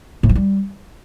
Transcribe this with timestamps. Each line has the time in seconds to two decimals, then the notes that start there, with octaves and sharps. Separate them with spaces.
0.23 A2
0.29 F3
0.35 G3